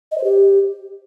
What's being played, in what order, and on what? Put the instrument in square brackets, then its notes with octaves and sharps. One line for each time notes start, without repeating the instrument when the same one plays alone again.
[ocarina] D#5
C5
G4